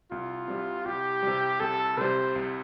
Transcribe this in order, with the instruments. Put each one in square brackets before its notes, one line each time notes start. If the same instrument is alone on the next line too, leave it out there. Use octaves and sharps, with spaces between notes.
[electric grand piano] C2 [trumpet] F4
[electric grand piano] C3 G3
[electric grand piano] C2 [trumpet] G4
[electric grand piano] C3 G3
[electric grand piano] C2 [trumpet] A4
[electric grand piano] C3 G3 [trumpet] C5
[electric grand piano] C2